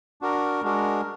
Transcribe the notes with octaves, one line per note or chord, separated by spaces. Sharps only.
D4 F#4 A#4
G#3 D4 F#4 A#4